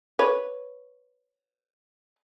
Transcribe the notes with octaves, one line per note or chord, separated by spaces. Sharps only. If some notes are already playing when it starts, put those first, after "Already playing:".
B4 C#5